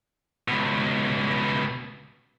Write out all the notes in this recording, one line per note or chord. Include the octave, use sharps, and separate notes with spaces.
C#2 B2